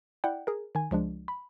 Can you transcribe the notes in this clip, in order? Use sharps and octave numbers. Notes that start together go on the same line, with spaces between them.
E4 D5 F#5 G5
G#4 A#4
D#3 G#5
C#2 F3 G#3 D4
B5